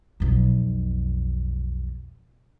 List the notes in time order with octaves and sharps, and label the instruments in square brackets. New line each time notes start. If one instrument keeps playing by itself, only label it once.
[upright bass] B1 F2